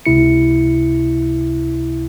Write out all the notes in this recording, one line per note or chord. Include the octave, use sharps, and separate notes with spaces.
C#2 C3 E4 C#7